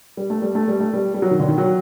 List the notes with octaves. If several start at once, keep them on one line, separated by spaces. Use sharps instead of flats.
G3
A3
G3
A3
G3
A3
G3
G3
F#3
D#3
D3
D#3
F#3